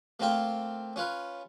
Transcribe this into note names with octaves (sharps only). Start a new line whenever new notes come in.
A3 A#3 C4 F4 G5
C#4 F4 B4